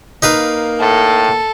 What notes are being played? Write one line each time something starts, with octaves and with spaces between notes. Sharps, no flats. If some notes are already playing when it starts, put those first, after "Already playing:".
A#3 D#4 B4 F5
A2 A4